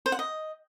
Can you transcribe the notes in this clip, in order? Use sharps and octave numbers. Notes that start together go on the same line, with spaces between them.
C5
F#5
D#5